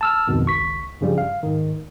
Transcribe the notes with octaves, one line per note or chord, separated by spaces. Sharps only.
A5 E6 F6
B1 F2 G#2 B2 D#3
G#1 C#2 C#6 B6
G2 C#3 F3 G3
F5
G#2 D#3